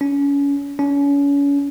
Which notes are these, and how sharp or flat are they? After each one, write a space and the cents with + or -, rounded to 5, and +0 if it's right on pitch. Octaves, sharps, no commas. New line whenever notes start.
C#4 +30
C#4 +35